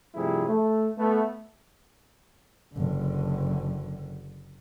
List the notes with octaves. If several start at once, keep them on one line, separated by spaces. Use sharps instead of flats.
G2 C3 F3 A3 E4 G#4
A3
A3 B3
F#1 D3